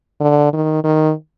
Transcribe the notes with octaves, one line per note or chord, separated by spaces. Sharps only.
D3
D#3
D#3